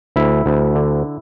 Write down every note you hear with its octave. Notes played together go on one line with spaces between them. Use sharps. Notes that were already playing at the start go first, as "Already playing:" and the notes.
D2 E4
D2
D3